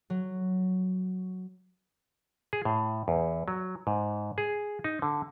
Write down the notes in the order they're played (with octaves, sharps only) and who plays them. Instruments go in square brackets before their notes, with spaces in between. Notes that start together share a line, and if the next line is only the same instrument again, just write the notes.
[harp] F#3
[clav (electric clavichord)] G#4
A2
E2
F#3
G#2
G#4
D#4
D3